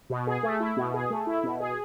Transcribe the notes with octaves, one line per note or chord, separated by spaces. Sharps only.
B2
G#4
A3
E4
B2
G#4
A3
E4
B2
G#4